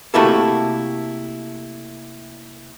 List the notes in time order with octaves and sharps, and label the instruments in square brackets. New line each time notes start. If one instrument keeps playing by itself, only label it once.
[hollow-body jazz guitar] C3 A3 A#3 E4 F#4 A4